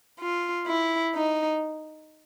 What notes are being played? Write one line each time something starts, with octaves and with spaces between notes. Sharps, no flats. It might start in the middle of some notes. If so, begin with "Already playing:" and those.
F4
E4
D#4